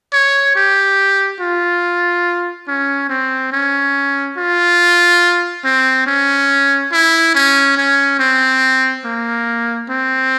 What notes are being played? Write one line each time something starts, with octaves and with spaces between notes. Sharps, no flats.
C#5
G4
F4
C#4
C4
C#4
F4
C4
C#4
E4
C#4
C#4
C4
A#3
C4